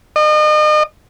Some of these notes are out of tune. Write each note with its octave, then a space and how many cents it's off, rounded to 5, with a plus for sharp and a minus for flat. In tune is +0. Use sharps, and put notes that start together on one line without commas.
D#5 -35